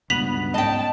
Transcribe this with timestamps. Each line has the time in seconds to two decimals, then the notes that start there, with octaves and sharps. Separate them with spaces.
0.10 C#2 G2 B2 B3 B6 F7 F#7
0.54 G#2 C#4 D#5 G5 A5